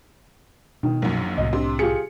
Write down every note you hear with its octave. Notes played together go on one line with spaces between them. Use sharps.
B2 D#3
A#1 F#2
C2 A2 D#5
C3 D4 C6
F4 G4 G#4 C#7